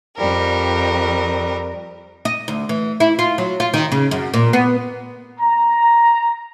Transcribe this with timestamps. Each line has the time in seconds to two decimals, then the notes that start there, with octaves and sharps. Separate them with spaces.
0.17 F2 G3 A#4
2.25 D#5
2.48 D2
2.69 E3
3.00 E4
3.19 F4
3.38 F#3
3.60 F4
3.74 D#3
3.92 C#3
4.11 F#2
4.34 A#2
4.53 B3
5.40 A#5